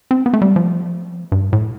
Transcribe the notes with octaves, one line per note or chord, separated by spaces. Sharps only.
C4
B3
A3
G3
F3
G2
A2